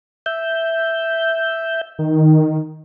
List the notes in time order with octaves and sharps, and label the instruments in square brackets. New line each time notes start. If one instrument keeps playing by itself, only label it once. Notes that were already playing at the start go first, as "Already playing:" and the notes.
[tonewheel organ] E5 G6
[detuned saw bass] D#3